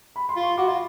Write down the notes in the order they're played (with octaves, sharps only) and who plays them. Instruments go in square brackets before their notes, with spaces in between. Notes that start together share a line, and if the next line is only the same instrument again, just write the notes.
[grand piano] B5
C6
[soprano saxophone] F4
[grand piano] C#6
[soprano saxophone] F#4 [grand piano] D6
[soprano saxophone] F4